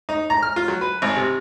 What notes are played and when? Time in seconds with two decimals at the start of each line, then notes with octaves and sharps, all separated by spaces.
0.09 D#4
0.30 A#5
0.42 F6
0.56 F4
0.68 F#3
0.81 B4
1.02 G#1
1.17 C3